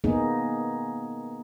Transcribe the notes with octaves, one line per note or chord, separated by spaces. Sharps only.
A#3 B3 D#4 G#4